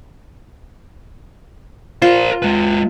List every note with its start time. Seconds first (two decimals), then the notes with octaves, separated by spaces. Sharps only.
2.02 F4 A#4 C5
2.42 G#3 B4